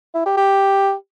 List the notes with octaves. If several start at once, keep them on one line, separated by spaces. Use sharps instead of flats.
E4
G4
G4